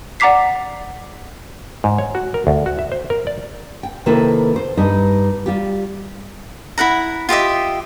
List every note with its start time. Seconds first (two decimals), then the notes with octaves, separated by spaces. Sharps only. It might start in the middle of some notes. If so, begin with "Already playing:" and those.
0.20 D5 F#5 A#5 D6 B6 C7
1.84 G#2
1.98 C#5
2.15 F#4
2.34 A#4
2.47 D2
2.66 F#4
2.79 E5
2.92 C5
3.10 A#4
3.27 D5
3.83 G5
4.06 C3 D#3 A#3 E4 A4 B4
4.56 C5
4.77 G2 G3 D#4 D#5
5.46 G3 F4 G4
6.78 E4 A4 F#5 A#5
7.29 F4 G4 D#5 E5